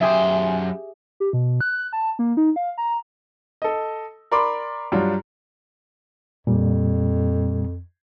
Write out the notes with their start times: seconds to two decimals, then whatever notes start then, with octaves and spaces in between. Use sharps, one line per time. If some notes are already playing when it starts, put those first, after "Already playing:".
0.01 F#2 G4 G#4 C5 E5
1.20 G4
1.33 B2
1.61 F#6
1.93 A5
2.19 A#3
2.37 D#4
2.56 F5
2.78 A#5
3.62 A4 D#5
4.32 A#4 D5 B5 C6 D6
4.92 G2 F#3 G3 D4 F4
6.47 F2 A#2 G3